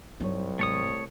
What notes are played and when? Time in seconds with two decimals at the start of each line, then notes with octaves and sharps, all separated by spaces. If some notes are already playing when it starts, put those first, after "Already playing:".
0.20 C2 G2 F#3 D#4 C#5
0.59 G#2 C3 D#3 A3 C#5 D#6